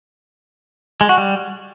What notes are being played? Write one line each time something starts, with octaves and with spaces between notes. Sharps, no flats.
G#3
F#4
G3